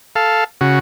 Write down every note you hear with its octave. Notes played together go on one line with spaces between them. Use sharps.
A4 F5
C#3 F#4